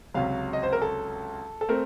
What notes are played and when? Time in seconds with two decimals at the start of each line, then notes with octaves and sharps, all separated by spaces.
0.14 C#2 C3 F#3 F5
0.53 D#5
0.63 C5
0.73 A#4
0.82 A4
1.61 A4
1.69 A3 C4 A#4